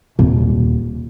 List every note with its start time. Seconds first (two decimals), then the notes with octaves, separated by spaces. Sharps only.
0.19 D#1